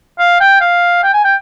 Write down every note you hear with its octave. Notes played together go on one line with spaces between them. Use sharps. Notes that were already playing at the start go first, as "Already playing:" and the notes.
F5
G5
F5
G5
G#5
G5